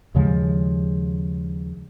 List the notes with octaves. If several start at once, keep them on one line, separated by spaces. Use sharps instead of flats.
D#2 C#3 F3 G#3